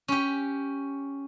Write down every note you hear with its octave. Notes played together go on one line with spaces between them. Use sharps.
C#4 G4